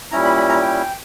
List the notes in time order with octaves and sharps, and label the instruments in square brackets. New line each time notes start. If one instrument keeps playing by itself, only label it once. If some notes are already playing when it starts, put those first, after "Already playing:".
[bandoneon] A#2 G3 C#4 E4 A#5
B5
B5
A#5
G5